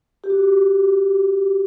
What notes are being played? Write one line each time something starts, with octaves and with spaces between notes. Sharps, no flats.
G4
F#4